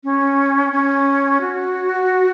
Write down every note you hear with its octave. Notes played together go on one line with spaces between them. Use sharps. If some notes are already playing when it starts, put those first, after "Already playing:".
C#4
C#4
F#4